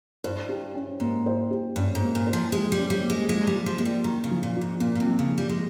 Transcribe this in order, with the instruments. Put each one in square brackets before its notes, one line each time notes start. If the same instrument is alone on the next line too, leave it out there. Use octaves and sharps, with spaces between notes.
[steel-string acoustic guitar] G2 [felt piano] C5
[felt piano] G4
C#4
[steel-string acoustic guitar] G#2 [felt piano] A#3
[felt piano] C5
G4
[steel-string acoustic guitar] G2 [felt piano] C#4
[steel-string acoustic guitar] G#2
[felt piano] A#3
[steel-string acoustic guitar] A#2
[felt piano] C5
[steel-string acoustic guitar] F3
[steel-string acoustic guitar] G#3 [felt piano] G4
[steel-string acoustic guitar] G3
[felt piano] C#4
[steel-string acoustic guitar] G3
[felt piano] A#3
[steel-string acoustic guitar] G#3
[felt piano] F3 [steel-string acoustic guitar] G#3
[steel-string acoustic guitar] G3
[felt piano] F4
[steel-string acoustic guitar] F3
[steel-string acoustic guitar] G#3 [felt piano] A#3
[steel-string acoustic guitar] G3
[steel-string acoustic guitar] D#3 [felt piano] F3
[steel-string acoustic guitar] C#3
[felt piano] F3
[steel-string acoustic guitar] A#2
[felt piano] F4
[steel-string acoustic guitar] G#2
[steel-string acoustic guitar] A#2 [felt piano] A#3
[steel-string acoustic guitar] A#2
C3
[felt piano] F3
[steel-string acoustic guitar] C#3
[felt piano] F3
[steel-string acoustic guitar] G3
G#3